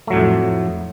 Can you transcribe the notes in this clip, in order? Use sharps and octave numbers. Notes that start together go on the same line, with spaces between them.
F2 A2 F#3 A3